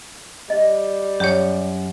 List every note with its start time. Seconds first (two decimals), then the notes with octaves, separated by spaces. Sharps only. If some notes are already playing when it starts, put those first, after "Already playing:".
0.50 G3 D#5
1.20 F#2 G4 C#5